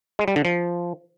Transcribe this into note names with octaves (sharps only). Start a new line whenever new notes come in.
G#3
G3
D3
F3